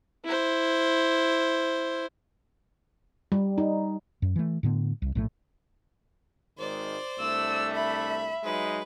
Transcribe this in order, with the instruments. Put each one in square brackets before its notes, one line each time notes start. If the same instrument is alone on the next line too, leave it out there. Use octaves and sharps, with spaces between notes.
[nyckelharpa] E4 C5
[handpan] G3
D#4
[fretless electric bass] F#2
E3 A3
A2 D3 B3
C2
A#1 A2 D#3 A3
[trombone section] G#1 D#3 G#3 [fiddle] C5 D5
[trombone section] C2 A3 D4 [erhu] E6
[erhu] E5 [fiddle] B5
[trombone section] F#3 G#3 D#4 [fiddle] B4